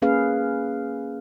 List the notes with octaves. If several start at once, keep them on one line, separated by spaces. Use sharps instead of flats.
A#3 C#4 G#4 B4 F5